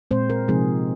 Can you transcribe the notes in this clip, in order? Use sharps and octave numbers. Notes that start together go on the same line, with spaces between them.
A#2 G#3 C4 C5
A#4
C3 F3 G#3 C4 D#4 G#4